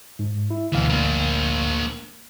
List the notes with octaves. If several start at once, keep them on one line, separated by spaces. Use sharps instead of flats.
G#2
E4
G1 D2 B2 E3 F5
A#3 D4